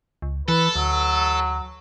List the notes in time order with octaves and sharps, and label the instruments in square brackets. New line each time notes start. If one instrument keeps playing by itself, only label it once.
[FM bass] C#2
[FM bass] E3 [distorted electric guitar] A4 [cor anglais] B4
[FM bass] D2 [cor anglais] F#3